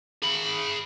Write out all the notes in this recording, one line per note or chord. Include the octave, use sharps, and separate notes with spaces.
G#4 B5